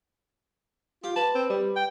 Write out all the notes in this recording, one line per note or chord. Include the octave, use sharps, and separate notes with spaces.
F4 G4
B4 A5
C4
G3
G5